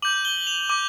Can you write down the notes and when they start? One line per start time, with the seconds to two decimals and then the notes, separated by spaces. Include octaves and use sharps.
0.02 D6 G6 F#7
0.25 G7
0.47 F7
0.70 D6 G6